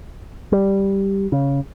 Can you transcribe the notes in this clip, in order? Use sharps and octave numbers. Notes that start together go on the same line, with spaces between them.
G3
C#3